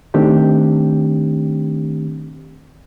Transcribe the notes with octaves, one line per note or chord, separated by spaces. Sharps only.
D#3 A3 C4 D4 G4